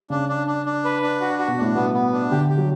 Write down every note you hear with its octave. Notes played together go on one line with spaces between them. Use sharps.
C#3 D4
D4
D4
D4
B4
D4
F#4
F#4
B2
A2 D4
B2 B3
B3
D4
D3 G4
G4
F#3